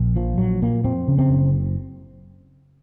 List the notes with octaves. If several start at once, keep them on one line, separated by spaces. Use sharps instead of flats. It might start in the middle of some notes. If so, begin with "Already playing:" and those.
Already playing: A#1
A#2 F3
A#1 F#3
A#2 A#3
F2 C4
C#3
C4
F#1